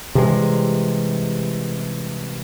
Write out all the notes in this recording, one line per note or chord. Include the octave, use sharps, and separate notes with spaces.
C3 E3 G3 G#3